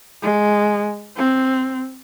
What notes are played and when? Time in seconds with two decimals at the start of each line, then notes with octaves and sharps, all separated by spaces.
0.22 G#3
1.17 C4